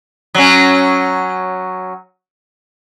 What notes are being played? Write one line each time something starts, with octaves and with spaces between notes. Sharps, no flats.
F#3 C#4